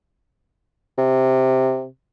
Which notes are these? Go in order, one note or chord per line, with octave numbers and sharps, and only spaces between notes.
C3